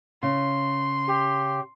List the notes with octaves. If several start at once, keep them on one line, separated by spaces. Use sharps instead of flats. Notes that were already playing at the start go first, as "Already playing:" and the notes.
C#3 C6
G4